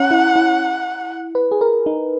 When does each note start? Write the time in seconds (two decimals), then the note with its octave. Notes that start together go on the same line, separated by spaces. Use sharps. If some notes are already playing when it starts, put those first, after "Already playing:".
Already playing: C#4 F#5
0.11 E4
0.36 E4
1.35 B4
1.51 G#4
1.61 A#4
1.86 D#4